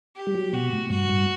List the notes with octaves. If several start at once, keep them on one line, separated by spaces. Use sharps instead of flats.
G4
G3
F#3
B2 F#4
A2
G2 F#4
G2